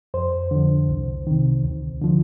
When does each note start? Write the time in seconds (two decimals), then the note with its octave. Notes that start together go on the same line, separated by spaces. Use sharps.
0.14 F2 C5
0.51 D3 F3
0.89 C2
1.27 C3 D#3
1.64 D2
2.02 D3 F3